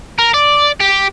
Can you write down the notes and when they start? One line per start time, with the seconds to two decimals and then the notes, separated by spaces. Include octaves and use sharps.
0.19 A#4
0.34 D5
0.80 G4